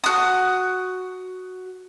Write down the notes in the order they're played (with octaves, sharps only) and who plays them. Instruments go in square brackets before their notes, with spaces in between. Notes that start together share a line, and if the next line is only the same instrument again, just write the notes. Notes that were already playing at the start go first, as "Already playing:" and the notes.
[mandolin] F#4 D#6